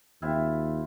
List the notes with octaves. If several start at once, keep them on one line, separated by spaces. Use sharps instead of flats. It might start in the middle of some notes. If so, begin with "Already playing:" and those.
D#2 C4 E4 F4